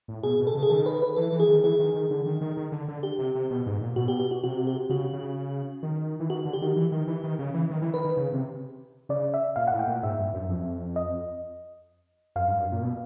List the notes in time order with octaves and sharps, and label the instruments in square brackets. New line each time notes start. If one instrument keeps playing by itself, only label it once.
[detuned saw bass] A2
[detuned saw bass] B2 [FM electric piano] G#4
[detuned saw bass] B2
[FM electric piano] A4
[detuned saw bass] C#3
[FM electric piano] G#4
[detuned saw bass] D#3 [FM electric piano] A4
[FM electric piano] B4
B4
[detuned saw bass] E3 [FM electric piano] A4
[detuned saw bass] E3
[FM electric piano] G#4
[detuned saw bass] D#3
[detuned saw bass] E3 [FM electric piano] G#4
[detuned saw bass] D#3
D#3
D3
D#3
D#3
D#3
D3
D3
[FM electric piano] G4
[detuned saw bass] C3
C3
B2
G#2
A#2
[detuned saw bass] B2 [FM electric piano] F#4
[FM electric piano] G4
G4
F#4
[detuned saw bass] C3 [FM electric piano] F#4
[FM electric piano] G4
[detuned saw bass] C#3 [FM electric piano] F#4
[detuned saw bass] C#3
D#3
E3
[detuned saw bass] D#3 [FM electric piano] F#4
[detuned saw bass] D3
[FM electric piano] G4
[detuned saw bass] D#3
E3
D#3
E3
D#3
C#3
E3
D#3
E3
[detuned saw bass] D#3 [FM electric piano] B4
[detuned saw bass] D#3
C#3
C3
[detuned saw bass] C#3 [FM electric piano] D5
[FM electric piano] E5
[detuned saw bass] A#2 [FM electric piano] F5
[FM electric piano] F#5
[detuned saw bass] A2
[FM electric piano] G5
[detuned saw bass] A#2
[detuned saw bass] G#2 [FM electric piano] E5
[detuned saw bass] G2
F#2
F2
[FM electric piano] D#5
[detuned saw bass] F#2 [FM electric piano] F5
[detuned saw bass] G2
F#2
A#2
B2